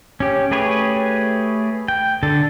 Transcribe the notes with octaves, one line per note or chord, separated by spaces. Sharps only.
C#4 G4
A3 G4 G#4 B4 C#5
G5
D3 A4 A5